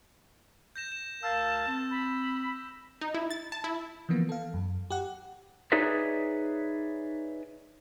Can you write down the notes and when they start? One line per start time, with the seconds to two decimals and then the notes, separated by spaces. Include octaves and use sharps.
0.76 G6 A#6 E7
0.92 E7
1.23 D2 A#4 F5 A5 E6
1.68 C4
1.91 B5
3.01 D#4
3.14 E4
3.31 A6
3.52 A5
3.64 E4
4.09 E3 F3 A#3 B3
4.29 A4 F5
4.54 F#2
4.90 G4 F#5
5.72 D#4 G#4 B4 C#5 D5 E5